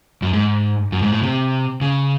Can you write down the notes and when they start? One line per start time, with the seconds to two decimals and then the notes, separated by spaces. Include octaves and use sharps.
0.22 F#2
0.33 G#2
0.92 F#2
1.02 G#2
1.12 A2
1.23 C3
1.81 C#3